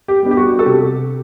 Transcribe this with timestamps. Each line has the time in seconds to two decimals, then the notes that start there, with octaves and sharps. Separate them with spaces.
0.08 G4
0.23 G3 B3 D4
0.31 G4
0.37 F#4
0.59 A4
0.66 C3 G4